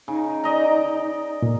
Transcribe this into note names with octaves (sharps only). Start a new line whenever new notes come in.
C#3 D#4
D5 D#5 A#5
A#2